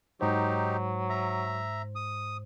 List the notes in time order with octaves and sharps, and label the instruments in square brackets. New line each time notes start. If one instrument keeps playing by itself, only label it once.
[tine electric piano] G#2 C5 [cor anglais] F#3 [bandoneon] D#4 G4
[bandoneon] E5 A#5
D#6